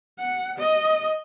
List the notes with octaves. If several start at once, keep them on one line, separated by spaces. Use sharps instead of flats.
F#5
D#5